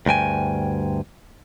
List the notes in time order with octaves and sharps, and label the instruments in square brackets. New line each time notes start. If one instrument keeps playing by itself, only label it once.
[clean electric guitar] D2 G2 G5 G#5